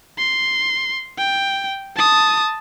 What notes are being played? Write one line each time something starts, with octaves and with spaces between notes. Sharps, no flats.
C6
G5
A5 D#6